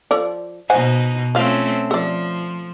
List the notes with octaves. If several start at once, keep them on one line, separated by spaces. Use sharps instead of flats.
F3 A4 D5
B2 D#4 C5 F#5 G#5
F3 A3 C4 C#4 F5
F3 A4 D5